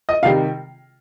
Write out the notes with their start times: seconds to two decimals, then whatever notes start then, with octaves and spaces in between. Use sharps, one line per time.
0.09 D#5
0.22 C3 D#3 G3 F5